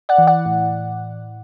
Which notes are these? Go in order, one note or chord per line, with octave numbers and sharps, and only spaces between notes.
D5 F#5
E3
D5 F#5
A2